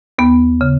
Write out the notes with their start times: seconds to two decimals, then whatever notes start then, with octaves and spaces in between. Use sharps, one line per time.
0.19 D#2 B3
0.61 C#3